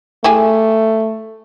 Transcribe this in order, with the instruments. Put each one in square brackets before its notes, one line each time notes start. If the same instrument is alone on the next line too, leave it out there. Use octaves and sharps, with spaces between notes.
[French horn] A3 [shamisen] E4 G4 G#4